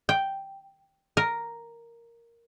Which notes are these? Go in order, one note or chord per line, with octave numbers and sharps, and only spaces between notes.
G5
A#4